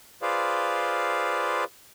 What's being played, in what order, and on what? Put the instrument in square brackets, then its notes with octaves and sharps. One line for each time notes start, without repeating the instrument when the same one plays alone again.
[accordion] F4 G#4 B4 C5 D5 F5